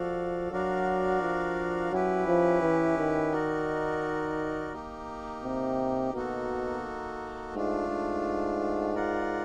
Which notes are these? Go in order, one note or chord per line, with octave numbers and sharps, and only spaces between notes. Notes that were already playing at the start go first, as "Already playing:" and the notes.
Already playing: F3 F#4 A4 D5 F5
F#3 D4 F#4 A#4 D5 F5
F3
F#3 C#4 E4 G4 B4
F3
E3
D#3
D#4 F#4 A#4 D5
A#3 D#4 G4
C3
B2 A#3 D#4 F#4 A4
G#2 A3 D4 F4
G#2
F4 A#4 D5 F#5